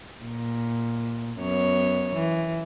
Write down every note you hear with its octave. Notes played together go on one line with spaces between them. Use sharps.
A#2
F#2 B3 C#5
E3